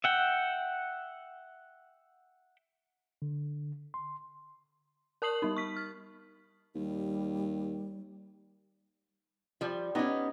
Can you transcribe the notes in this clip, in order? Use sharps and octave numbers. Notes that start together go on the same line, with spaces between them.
E5 F#5 G5
D3
C6
A#4 A5 D#6 C7 F#7
G3 D#4
C#6 B6
F6
D#2 G3
F3 G3
B3 C#4 D#4 G4 D#5